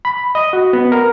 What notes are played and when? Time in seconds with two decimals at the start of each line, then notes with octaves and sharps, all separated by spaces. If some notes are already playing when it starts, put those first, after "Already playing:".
0.05 B5
0.35 D#5
0.53 F#4
0.73 B3
0.92 A#4